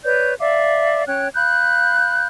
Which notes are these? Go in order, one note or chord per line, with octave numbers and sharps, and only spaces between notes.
B4 C#5 D5 G6
D5 E5 F5 D6
C#4 C#5 G5 F#6
F5 B5 F#6 G6